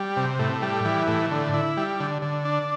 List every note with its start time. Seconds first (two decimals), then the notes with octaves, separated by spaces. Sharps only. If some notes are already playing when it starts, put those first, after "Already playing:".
Already playing: G3
0.17 C3
0.39 A2
0.62 G3
0.85 E3
1.08 A2
1.31 D3
1.54 E4
1.77 G3
2.00 D3
2.22 D3
2.45 D4